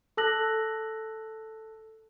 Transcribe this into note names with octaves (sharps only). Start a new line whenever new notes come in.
A4 A5 E6 F#6 A#6 F#7